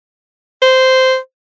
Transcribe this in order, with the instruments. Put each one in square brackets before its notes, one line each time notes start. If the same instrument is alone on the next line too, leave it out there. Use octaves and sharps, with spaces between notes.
[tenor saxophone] C5